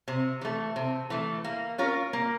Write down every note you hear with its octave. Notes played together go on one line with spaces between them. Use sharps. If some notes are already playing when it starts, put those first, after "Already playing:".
C3
E3 A3
C3
E3 A3
A#3
C#4 F4 A#4
A#3